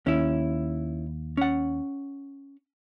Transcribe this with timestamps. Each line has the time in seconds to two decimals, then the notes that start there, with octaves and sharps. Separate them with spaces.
0.07 D#2 C#4 E4
1.37 C#4 F#5